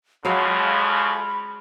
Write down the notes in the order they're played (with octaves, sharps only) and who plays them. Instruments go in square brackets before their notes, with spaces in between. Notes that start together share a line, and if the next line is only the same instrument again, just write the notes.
[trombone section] F2 C#3 [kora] F#3 G#3 F5 [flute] B5